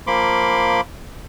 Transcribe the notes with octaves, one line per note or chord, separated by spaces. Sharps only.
F3 A#3 B5 C6 D6